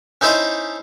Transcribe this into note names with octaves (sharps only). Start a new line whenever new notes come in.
C#4 D#4 E4 C5 A5